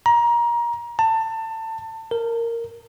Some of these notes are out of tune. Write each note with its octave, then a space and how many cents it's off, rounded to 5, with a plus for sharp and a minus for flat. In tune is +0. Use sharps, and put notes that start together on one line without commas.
A#5 +25
A5 +25
A#4 -10